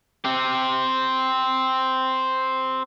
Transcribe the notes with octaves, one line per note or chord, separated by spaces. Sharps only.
C4 G4